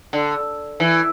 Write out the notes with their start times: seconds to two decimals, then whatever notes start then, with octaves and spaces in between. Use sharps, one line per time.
0.13 D3
0.80 E3